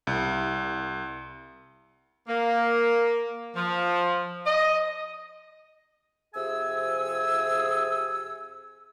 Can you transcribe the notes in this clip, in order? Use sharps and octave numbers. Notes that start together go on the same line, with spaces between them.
C2
A#3
F3
D#5
F2 C3 G#4 E5 G#5 E6